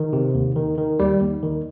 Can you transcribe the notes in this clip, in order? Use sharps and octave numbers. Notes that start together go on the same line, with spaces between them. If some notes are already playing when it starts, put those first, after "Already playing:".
Already playing: D#3
C3
D#2
D#3
D#3
D#2 G3
D#2
D#3